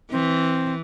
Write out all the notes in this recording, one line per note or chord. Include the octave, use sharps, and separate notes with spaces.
E3 C4